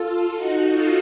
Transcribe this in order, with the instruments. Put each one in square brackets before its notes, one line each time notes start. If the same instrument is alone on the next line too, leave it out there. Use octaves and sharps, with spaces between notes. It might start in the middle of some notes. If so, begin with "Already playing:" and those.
Already playing: [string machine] F4 A4
D#4 F#4
F4 A4